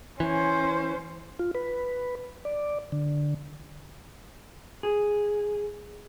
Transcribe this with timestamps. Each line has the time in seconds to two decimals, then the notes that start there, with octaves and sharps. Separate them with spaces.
0.20 E3 C#4 C5
1.39 F4
1.55 B4
2.45 D5
2.92 D3
4.83 G#4